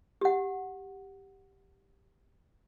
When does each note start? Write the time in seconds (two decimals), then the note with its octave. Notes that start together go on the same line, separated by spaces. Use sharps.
0.21 G4 F#5